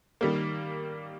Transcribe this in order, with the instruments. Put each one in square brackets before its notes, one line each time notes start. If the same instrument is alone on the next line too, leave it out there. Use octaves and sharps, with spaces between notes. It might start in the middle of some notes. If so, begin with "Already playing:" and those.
[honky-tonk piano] D#3 G3 A#3